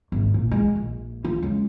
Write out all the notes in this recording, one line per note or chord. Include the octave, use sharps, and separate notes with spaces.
G#1
A#2
G#3
A#1
F4
C#2